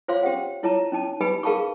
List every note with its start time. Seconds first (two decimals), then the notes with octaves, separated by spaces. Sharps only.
0.08 F4 C5 C#5 F5 C6
0.23 C#4 G4 C5 F#5
0.63 E4 F4 C#5 A5 A#5
0.92 C#4 D#4 A5
1.21 D#4 G4 B4 G#5 B5
1.43 G#4 A#4 F5 A5 B5 C#6